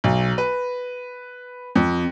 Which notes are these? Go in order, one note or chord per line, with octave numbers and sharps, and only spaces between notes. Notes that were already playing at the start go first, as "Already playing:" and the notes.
B1
B4
F2